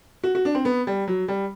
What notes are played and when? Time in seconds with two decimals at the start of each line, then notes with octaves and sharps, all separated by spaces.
0.24 F#4
0.35 F#4
0.45 D4
0.55 C4
0.65 B3
0.87 G3
1.08 F#3
1.28 G3